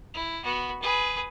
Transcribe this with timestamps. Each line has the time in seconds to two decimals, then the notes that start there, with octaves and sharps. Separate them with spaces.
0.14 E4
0.44 B3 F#4
0.82 G#4 B4